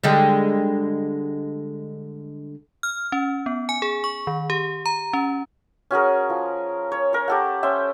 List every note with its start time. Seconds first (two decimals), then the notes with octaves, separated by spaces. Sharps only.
0.04 D3 G3 G#3
2.83 F6
3.12 C#4
3.46 B3
3.69 G#5
3.82 G#4
4.04 C#6
4.27 D#3
4.50 G4
4.86 A#5
5.13 C#4
5.91 C#4 F#4 G#4 A#4
6.30 F3
6.92 C#5
7.13 A#4 C#5
7.28 G4 A4 F#5
7.63 C#4 C5 E5 G5